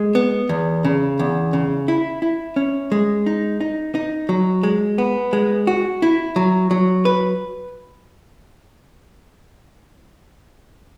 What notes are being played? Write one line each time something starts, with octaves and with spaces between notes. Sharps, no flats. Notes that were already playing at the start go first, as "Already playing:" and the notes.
Already playing: G#3
B3
E2
C#3
E2
C#3
E4
E4
C#4
G#3
D#4
D#4
D#4
F#3
G#3
B3
G#3
F#4
E4
F#3
F#3
B4